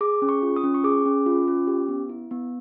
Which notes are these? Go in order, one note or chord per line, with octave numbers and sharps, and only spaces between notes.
G#4 D6
C#4
C#6
F4
D#6
C#4
C#6
G#4 D6
C#4
F4
C#4
G4
B3
E4
B3